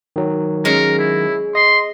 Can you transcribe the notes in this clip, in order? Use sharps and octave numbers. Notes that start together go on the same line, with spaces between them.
D#3 F#3
G#3 C#4 A#4
E4
D#5 C6